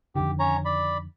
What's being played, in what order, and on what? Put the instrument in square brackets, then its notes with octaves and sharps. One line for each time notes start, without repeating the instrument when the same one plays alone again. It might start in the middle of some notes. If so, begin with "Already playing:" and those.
[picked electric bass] F2 D3 D#3 [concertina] G4
[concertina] C#4 C#5 A#5
D5 B5